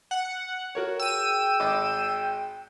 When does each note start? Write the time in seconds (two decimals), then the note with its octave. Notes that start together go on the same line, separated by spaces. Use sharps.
0.11 F#5
0.75 F#4 A#4 C#5
0.99 G#4 G5 E6 D#7
1.60 G#1 D#5 D6